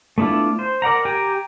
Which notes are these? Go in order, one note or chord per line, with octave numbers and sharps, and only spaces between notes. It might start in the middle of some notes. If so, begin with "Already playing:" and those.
A3 B3 D4 E4 F4
C5
A#4 D5 F#5 A#5
G4 G5 G#5 A#5